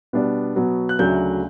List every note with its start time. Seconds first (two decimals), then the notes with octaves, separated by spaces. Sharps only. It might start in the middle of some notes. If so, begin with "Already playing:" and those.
0.13 B2 G3 B3 D4
0.55 B2 F#3 B3
0.89 F#6
0.99 D2 C#3 F#3 A3 D4 G6